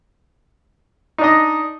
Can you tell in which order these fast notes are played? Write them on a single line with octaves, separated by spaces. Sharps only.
D#4 D4 D#5